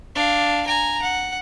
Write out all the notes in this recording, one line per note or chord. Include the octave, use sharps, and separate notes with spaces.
D4 F5
G#5 A#5
F#5